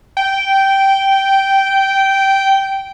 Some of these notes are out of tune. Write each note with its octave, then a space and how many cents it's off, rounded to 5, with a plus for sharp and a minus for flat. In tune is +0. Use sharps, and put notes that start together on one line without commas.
G5 -10